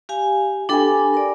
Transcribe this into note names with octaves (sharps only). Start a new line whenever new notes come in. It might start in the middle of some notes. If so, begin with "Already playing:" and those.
G4 F5 G#5
D4 G4 A4 G#5 B5
D6
A#4 D5